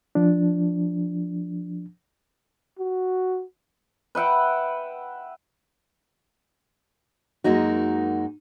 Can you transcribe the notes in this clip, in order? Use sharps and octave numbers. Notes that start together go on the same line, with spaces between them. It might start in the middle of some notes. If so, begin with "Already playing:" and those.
F3 D4
F#4
B4 E5 F#5 G5
F#2 G#3 A#3 D#4 F#4